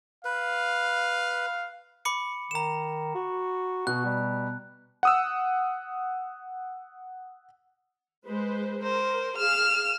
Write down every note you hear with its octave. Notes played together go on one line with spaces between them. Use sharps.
B4 F5
B5 D6 C#7
D#3 A#5 E7
F#4
B2 F#4 F#6
G3
F#5 D#6 E6
G#3 B4 C5
A#4 C5
G#4 F5 F6 E7